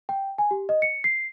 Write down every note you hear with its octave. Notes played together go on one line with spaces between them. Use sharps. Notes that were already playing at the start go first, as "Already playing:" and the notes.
G5
G#5
G4
D#5
C#7
C7